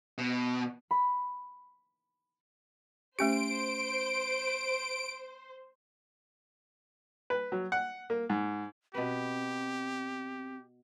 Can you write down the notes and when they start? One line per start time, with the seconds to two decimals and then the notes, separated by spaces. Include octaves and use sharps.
0.18 B2
0.91 B5
3.19 A3 C#4 G4 C5 D7
7.30 B4
7.52 F#3
7.72 F#5
8.10 A#3
8.30 G#2
8.95 B2 C4 G4 B4